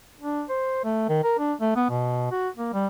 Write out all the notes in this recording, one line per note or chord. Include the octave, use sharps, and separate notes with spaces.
D4
C5
A3
D#3
A#4
D4
A3
B3
B2
F#4
A#3
G3